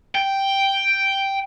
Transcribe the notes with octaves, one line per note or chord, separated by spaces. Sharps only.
G5